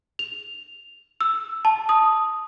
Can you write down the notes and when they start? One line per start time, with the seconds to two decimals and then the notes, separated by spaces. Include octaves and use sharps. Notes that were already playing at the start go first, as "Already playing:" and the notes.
0.19 F7
1.21 E6
1.65 A5
1.89 D#6